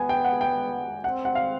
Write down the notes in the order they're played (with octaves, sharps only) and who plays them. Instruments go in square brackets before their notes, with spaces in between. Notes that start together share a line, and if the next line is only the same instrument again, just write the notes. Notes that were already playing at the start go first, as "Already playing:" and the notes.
Already playing: [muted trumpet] B3 [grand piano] G#5
[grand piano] G5
F#5
G5
[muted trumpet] C4 [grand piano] F#5
[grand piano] F#5
F5